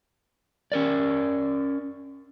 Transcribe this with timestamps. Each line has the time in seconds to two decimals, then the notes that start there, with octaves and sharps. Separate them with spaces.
0.72 C#4 A#4 D5